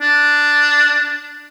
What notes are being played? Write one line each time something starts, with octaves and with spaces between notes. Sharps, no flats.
D4